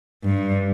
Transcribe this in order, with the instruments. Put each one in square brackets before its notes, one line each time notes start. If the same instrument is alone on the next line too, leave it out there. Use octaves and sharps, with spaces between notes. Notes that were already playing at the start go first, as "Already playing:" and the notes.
[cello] G2